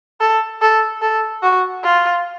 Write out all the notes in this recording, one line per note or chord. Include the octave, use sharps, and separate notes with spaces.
A4
A4
A4
F#4
F4